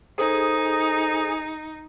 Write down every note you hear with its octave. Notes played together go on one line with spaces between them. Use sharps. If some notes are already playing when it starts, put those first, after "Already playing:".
D#4 G#4 A4 C5 D#6